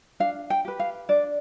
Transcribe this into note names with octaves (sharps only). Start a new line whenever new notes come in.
D4 F5
G5
G4 B4
F5
D4 D5